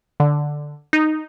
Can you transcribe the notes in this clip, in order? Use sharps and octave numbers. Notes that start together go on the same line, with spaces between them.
D3
D#4